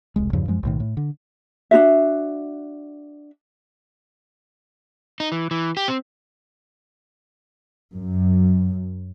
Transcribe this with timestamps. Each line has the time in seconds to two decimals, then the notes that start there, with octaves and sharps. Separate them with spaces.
0.16 E1 C2 G#3
0.33 E2 G2 C#3 F3
0.48 F#2 F3 G#3
0.63 B1 A2 D#3
0.80 A2
0.97 D3
1.71 D4 D#4 F#4 E5
5.20 D#4
5.32 E3
5.51 E3
5.77 G4
5.88 C4
7.95 F#2